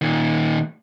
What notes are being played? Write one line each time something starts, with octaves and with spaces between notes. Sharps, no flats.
A#2 D#3